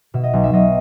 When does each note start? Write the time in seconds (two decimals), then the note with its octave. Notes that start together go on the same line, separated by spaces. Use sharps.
0.14 B2 E5
0.23 D#5
0.33 B1
0.44 E5
0.53 B1 D#5